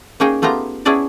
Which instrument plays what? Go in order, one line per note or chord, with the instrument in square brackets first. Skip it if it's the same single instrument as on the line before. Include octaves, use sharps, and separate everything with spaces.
[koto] A#3 C#4 D#4 G#4 G5
A3 B3 F4 G4 A#5
B3 C#4 E4 G#4 D5 A5